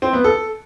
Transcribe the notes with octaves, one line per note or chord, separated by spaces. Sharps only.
C4
B3
A4